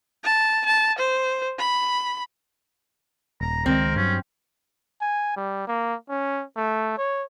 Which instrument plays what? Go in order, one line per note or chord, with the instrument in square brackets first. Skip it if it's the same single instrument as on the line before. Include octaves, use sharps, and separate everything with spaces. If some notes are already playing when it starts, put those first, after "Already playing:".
[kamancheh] A5
A5
C5
B5
[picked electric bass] D#1 [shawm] A#5
[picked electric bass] C#2 D#3 G#3 [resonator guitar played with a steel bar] C4 [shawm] A#4
[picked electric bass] G2 F#3 [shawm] C#4
[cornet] G#5
G3
A#3
C#4
A3
C#5